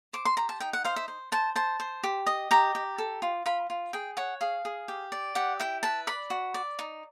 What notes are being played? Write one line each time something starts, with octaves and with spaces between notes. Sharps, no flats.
C5 D6
C6
G4 A#5
A5
D#4 G5
F#5
C5 F5
E5
C5
C5 A5
C5 A5
C5
G4
D#5
G4 A#5
G4
A4
F4
F4 B5
F4
G#4 G5
C#5 F#5
G#4 F5
G#4
G4
D5
G4 F#5
E4 G5
B4 A5
D5 B5
F#4
D5
D#4